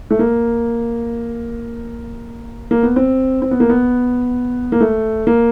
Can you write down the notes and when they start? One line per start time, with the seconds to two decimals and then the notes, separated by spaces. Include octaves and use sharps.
0.11 A3
0.19 A#3
2.71 A#3
2.83 B3
2.96 C4
3.42 C4
3.51 B3
3.60 A#3
3.70 B3
4.72 A#3
4.80 A3
5.27 A#3